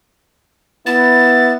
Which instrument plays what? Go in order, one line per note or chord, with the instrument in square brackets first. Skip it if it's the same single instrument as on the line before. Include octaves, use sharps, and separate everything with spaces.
[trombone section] B3 E4 [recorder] A6